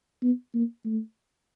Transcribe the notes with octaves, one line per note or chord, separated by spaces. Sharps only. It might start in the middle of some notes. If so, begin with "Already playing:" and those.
B3
A#3
A3